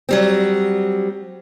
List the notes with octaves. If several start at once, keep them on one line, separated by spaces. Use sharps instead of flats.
F#3 G3 C4